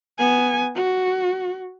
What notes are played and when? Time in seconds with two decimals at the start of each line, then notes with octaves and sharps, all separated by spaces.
0.19 B3 G#5
0.75 F#4